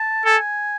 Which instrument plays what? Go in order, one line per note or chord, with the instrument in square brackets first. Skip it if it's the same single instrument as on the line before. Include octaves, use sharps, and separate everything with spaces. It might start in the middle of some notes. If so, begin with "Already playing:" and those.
Already playing: [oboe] A5
[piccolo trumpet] A4 [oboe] G#5